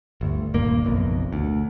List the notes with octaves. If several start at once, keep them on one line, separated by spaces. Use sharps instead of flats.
G1 D2
D#1 G2 A#3
F#1 B1 F2
D2